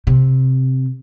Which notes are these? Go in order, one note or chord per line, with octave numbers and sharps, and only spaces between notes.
C3